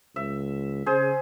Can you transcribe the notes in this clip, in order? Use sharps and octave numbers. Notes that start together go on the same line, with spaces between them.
C#2 E5
C#3 G#4 C5